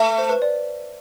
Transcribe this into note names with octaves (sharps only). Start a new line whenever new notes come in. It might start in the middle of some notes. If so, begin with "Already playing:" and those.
Already playing: A3
C5
B4
D5